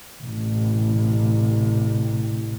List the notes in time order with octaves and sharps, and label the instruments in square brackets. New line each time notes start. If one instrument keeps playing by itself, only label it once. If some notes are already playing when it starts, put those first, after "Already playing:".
[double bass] A1 C3